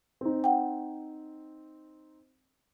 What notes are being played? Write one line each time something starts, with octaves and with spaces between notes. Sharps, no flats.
C4 D#4
F#5 G5